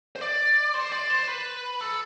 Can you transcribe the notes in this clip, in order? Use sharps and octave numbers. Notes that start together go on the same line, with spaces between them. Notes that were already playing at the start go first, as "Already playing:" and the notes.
C5
D5
C5
D5
C5
B4
A4